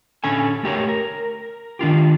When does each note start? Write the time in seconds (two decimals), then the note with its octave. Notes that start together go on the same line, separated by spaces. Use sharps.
0.24 D3 C#4 A4 G#5
0.63 A3 G4 A#4 C#5
0.89 A#4
1.79 D#3 D4 F4 G4